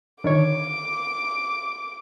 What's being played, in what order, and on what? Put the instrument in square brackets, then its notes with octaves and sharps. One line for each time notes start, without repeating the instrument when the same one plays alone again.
[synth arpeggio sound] D3 D#3 C#5 [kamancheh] D6